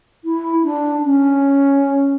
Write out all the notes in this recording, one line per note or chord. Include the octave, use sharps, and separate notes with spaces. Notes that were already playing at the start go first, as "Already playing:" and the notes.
E4
D4
C#4